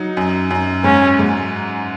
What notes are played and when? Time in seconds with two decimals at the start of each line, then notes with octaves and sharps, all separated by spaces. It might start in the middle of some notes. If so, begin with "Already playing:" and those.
Already playing: F#3 D#4
0.17 F#2
0.51 F#2
0.84 G#2 C#4
1.19 G#2